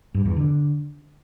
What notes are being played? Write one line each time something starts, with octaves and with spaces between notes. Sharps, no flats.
G2
E2
D3